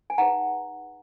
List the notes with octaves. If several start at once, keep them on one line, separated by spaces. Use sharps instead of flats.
G#5
D#4 G#4 B4 F#5 A#5